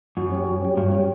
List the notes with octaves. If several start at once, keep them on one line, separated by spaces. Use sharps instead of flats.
F#2 F#3
C#4 G4
F#3
C#4 G4
G2 F#3
C#4 G4